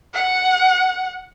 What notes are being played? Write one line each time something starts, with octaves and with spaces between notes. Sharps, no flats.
F#5